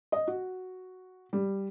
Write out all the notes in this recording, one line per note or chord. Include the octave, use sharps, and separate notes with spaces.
D#5
F#4
G3